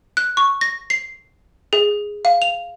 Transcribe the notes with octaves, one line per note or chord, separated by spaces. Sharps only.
F#6
C#6
A#6
C7
G#4
F5
F7